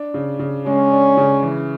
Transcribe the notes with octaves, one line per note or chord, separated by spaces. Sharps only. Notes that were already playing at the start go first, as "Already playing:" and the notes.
Already playing: D4
C#3
C#3
G#3 C#4
D4
C#3
E3